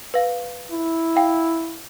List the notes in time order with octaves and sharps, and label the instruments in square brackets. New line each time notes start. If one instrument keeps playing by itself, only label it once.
[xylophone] B4 F5
[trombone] E4
[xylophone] F5 G5